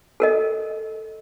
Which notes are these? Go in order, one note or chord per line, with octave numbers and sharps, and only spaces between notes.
A4 A#4 D#5